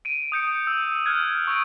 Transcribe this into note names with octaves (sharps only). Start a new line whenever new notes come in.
D7 D#7
D#6 G6 C#7
E6
F6 F#6 G#6
C#6 D#6 E6 D7